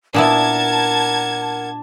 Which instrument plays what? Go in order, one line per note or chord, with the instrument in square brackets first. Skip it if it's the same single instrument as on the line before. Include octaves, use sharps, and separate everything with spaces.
[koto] A#2 B3 E4 [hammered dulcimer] D4 [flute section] A#4 F#5 [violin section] A5 G#6